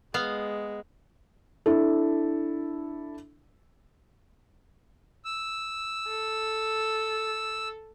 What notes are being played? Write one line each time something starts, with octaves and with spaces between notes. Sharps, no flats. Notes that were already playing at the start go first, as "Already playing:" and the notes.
G#3 B3 F5
D4 E4 A4
E6
A4